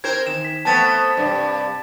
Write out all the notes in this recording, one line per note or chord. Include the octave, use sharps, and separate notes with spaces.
C4 A#4 C5 G#6
D#3 E7
B6
A3 B3 C4 A5 A6
G2 C3